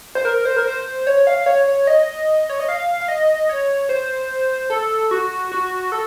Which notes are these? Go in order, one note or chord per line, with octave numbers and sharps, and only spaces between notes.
C5
A#4
C5
A#4
C5
C#5
F5
C#5
C#5
D#5
C#5
D#5
F5
F5
D#5
C#5
C5
A4
F#4
F#4
A4